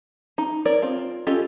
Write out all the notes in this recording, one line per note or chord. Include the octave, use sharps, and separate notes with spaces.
D#4
A#4 C#5 D5
C4 F4
C#4 F4 G4 A4 D#5